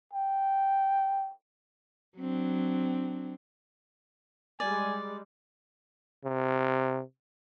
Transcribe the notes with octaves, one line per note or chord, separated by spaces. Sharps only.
G5
F#3 C4 D4
G3 G#3 D5 G#5
C3